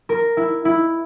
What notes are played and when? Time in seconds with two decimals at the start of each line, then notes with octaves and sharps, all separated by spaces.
0.09 A#4
0.37 E4
0.65 E4